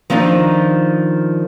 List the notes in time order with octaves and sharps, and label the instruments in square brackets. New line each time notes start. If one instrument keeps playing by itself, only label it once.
[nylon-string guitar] D#3 F3 C4 D4 D#4 F4